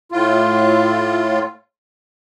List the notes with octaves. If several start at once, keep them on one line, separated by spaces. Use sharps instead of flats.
A2 F4